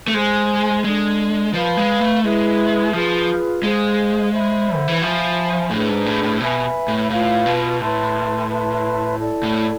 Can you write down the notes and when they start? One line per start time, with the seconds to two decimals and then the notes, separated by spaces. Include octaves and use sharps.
0.08 A3
0.14 G#3 C5 G#5 C6
0.84 G#3 D4 A4 D5
1.54 F3 B4 F5 B5
1.77 G#3
2.00 A3
2.23 G#3 E4 G#4 B4 E5
2.93 F3 F4 G#4 B4
3.62 G#3 G#4 C5 F5
4.32 C5 E5 B5
4.75 D3
4.88 E3
5.01 F3 C5 E5 G#5 B5
5.71 A2 D4 G#4 B4
5.89 G#2
6.06 A2
6.23 A2
6.40 B2 B4 E5 G#5 B5
6.88 A2
7.10 A2 F4 B4 F5
7.46 B2
7.80 A2 B4 E5 A5 C6
8.49 B4 E5 A5 C6
9.19 E4 A4 D5 A5
9.43 A2